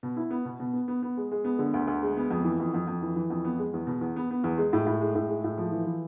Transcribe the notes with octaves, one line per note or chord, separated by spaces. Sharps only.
B2
E4
B3
B2
B2
B3
B3
B3
G#3
G#3
B3
D3
D2
D2
G#3
B3
F2
E3
F2
F2
F2
E3
E3
F2
B3
G#3
E2
B2
E2
B3
B3
E2
G#3
A2
A2
G#3
A2
G#3
A2
F3
E3
E3